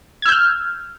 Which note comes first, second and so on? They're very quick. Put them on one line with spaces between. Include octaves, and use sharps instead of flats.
G#6 E6 G6 F6